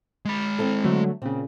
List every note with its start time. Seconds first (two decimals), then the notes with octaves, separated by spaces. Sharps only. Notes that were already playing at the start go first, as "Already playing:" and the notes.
0.25 G#3 B5
0.59 C4 E4 A4
0.84 D3 F#3 A3
1.22 A#2 C#3 C4